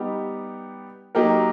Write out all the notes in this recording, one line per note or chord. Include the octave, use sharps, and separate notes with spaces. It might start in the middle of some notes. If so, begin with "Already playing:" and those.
Already playing: G3 B3 D#4 G4
F#3 A#3 D#4 G4 A#4